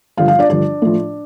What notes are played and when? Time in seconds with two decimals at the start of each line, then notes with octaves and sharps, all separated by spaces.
0.17 G2 D3 F3 F4 F5
0.28 F4 F5
0.39 D4 D5
0.49 G2 D3 F3 D4 D5
0.82 A2 F3